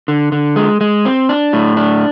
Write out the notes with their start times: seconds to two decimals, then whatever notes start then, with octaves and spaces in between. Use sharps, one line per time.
0.08 D3
0.32 D3
0.56 G#3
0.81 G#3
1.05 C4
1.29 D4
1.53 A2
1.77 D4